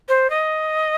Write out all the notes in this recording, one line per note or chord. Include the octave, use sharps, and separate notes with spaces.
C5
D#5